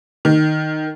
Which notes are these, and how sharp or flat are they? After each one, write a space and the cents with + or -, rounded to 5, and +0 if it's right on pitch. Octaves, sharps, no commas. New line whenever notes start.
D#3 -5